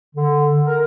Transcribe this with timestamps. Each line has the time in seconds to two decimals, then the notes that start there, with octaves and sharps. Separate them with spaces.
0.16 D3
0.66 A#4